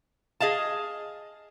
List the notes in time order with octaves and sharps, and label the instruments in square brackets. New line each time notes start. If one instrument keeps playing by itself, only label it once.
[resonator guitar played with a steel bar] G#4 D#5 F5 A5